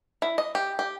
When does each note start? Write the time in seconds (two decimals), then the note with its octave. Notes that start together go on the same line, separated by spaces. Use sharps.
0.22 E4
0.38 D#5
0.55 G4
0.79 G4